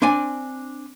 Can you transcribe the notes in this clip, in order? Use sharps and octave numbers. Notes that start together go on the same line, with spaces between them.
C4 D4 D5 G#5